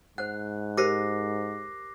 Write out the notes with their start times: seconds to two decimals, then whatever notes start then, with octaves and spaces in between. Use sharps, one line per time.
0.18 G#2 C5 F#5 F#6
0.77 G4 A#4 C5 D6 A#6 C7